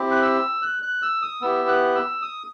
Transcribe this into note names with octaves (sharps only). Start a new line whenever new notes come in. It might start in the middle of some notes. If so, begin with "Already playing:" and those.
Already playing: C4 E4 G4
F#6
E6
F#6
F#6
E6
D#6
B3 E4 G4 E6
F#6
E6
D#6